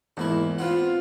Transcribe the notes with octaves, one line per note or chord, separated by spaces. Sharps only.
E2 G#2 A#3 E4
B3 C4 F4 F#5